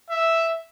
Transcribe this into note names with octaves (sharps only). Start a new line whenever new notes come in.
E5